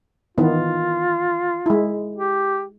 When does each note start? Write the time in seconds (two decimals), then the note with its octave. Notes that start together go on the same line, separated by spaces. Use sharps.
0.38 D#3 E3 B3 F4
1.66 G#3 E4
2.16 G4